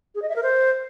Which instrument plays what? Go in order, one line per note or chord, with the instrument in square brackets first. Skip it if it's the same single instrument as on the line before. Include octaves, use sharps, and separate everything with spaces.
[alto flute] G#4
D#5
E5
A#4
C5